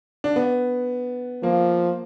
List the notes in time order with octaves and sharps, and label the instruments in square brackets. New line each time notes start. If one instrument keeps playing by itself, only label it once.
[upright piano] D4
B3
[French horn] F3 [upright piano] A#3